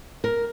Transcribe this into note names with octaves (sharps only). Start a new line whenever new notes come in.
A#4